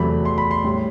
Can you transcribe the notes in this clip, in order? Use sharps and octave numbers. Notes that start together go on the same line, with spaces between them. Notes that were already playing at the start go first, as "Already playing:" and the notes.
Already playing: E2 C3 F#3 A3 B5
C6
B5
C6
A2 G3